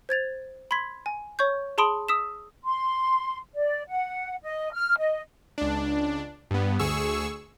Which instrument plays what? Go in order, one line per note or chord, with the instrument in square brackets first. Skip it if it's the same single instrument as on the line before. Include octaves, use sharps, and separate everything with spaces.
[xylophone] C5 G#6 A6 F7
B5 C6 G#6 B6
G#5
C#5 C#6 G6
G#4 A5 B5 C6 D#6 D7
D#6 E6 B6 E7
[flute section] C6
D5
F#5
D#5
F6
D#5
[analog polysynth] C#2 D4
G2 B3
D2 G#4 C#6 E6